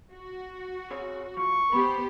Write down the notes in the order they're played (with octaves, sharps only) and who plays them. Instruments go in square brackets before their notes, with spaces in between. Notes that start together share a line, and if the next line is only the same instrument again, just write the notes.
[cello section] F#4
[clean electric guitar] C4 G#4 C#5
[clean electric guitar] D2 F3 [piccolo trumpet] C#6
[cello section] B3 G4 C5 [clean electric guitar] B5